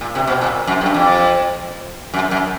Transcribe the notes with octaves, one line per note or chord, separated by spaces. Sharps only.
A#2
C3
B2
A#2
F#2
G2
F2
F#2
F#2